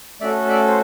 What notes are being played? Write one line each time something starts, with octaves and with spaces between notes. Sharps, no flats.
A3 C#4 F#4 A4 D5 E5
D5 E5
C5